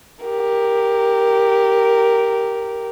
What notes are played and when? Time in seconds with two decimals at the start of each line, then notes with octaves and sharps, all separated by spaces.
0.24 G4 A#4